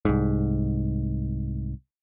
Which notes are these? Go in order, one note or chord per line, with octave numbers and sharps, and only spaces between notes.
C2 G#2